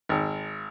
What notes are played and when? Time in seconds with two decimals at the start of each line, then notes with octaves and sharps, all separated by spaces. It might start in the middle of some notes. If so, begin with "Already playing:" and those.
0.09 G#1